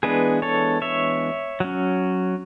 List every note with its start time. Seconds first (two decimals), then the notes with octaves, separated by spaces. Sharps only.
0.03 E3 G#3 B3 D4 G#4 B4
0.42 A4 C#5
0.82 C#5 E5
1.60 F#3 C#4